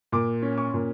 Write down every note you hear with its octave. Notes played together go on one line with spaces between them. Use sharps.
A#2 D6
C#4
C#6
A#2